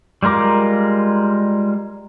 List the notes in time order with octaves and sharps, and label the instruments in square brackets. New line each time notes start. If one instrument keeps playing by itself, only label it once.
[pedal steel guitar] G3 G#3 F4 A#4 D6